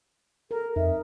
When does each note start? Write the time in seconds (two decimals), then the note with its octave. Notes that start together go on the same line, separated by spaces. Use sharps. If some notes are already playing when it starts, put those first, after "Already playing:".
0.51 A4 A#4
0.76 F2 D#4 E5